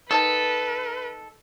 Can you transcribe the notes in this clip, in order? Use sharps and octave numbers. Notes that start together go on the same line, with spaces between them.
D#3 D#4 A4 B4 A5